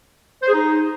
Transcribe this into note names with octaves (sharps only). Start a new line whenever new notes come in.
C5
G#4
D#4